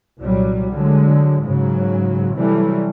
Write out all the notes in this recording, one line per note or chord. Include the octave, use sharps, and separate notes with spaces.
C2 A#2 F#3 G3
D3 F#3 G#3
G#2 C#3 F#3
C3 E3 F#3 G3 A3